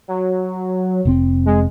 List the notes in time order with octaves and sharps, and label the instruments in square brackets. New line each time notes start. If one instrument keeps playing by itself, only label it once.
[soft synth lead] F#3
[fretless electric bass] F1 B2 C4
[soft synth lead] G#3